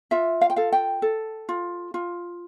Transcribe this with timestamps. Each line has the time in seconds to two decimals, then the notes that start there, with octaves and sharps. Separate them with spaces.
0.11 F4 E5
0.41 F5
0.50 G5
0.56 A4 F5
0.72 G5
1.02 A4
1.49 F4
1.94 F4